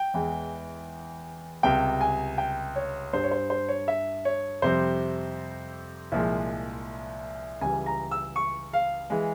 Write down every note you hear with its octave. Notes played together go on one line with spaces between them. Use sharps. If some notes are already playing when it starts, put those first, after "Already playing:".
Already playing: G5
E2 E3 G#3
C#2 C3 G3 G5
G#5
G5
C#5
G2 G3 C5
C#5
C5
C5
C#5
E5
C#5
F2 C3 G3 C5
C2 A#2 F3 G#3
C#2 C#3 E3 G3 G#5
A#5
E6
C#6
F5
E3 G#3